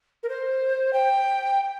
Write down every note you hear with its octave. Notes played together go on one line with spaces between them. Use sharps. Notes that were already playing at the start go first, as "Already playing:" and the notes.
A#4
C5
G5